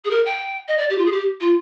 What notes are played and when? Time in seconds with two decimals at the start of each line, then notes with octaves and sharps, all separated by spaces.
0.04 G#4
0.10 A#4
0.25 G5
0.68 D#5
0.78 D5
0.90 G4
0.98 F4
1.06 G#4
1.11 G4
1.40 F4